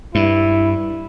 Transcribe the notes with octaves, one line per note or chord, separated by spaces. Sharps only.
G2 E4